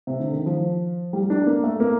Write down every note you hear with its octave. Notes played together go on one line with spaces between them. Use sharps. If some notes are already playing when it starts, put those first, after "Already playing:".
C3
D3
D#3
F3
G3
D4
A#3
A3
A#3